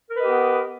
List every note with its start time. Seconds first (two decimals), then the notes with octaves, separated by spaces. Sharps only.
0.09 A#4
0.14 B4
0.19 D#5
0.24 G4
0.28 B3